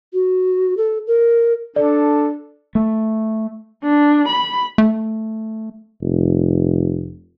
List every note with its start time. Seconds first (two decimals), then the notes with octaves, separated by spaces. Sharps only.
0.13 F#4
0.77 A4
1.07 A#4
1.76 D4 A4 D5
2.75 A3
3.84 D4
4.29 B5
4.78 A3
6.02 F1